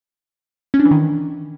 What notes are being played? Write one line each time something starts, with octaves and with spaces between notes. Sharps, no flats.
C#4
D4
E3
D#3